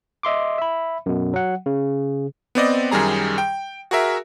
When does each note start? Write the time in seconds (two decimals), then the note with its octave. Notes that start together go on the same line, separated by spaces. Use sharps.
0.23 D#5 E5 C6 D6
0.58 E5 B5
1.06 F#2 B2
1.34 F#3 F#5
1.66 C#3
2.55 B3 C4 D5 D#5
2.91 F#2 D#3 G3 G#4 A#5
3.38 G5
3.91 F#4 G#4 A#4 E5